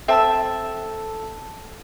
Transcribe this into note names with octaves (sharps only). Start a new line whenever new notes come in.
C4 A4 E5 A5 E6